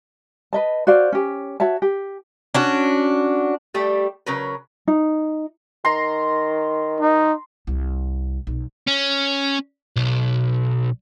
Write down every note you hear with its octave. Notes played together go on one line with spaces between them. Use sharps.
B4 D#5 A5
F#4 C5 D5 F5
C#4 G4
F#4 C#5 E5 A5
G4
C#4 D4 F#4
G3 A3 G4
C#3 F#3 A#4 B4
D#4
D#3 A#5 C6
D#4
C2
B1
C#4
B1